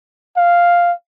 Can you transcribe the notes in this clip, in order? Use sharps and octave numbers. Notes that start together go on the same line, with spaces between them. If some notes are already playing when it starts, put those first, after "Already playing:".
F5